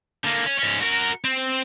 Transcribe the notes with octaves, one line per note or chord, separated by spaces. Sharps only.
D3 A#3
C#4
G#2 C#4
F#4 A#4
C4